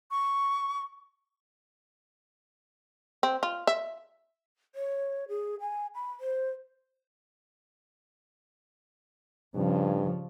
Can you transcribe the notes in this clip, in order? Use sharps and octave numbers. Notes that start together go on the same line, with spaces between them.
C#6
C4
F4
E5
C#5
G#4
G#5
B5
C5
G2 C#3 F3